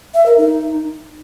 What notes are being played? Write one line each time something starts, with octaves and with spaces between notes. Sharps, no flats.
E5
A#4
D#4